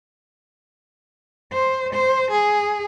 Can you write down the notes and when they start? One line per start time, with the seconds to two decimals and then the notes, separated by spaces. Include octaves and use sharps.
1.53 C5
1.94 C5
2.31 G#4